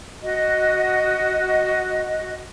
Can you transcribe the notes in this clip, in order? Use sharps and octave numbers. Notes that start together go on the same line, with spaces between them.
F#4 D#5